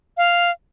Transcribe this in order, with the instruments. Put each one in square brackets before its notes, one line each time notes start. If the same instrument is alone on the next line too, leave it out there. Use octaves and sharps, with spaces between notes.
[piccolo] F5